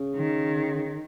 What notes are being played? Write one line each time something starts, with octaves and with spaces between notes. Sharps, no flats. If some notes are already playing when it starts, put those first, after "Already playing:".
Already playing: C#3
D#3